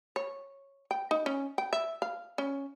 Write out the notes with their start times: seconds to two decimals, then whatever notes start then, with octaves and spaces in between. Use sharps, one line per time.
0.16 C#5
0.91 G5
1.11 D#4
1.26 C#4
1.58 G5
1.73 E5
2.02 F5
2.38 C#4